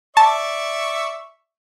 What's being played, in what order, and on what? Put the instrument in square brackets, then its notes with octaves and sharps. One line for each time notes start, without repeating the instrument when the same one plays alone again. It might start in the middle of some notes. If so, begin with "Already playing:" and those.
[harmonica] D5 E5 C#6 [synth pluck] A5